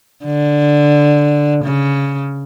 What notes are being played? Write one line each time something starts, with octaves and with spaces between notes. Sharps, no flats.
D3
C#3